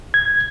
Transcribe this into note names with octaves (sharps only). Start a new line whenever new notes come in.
G#6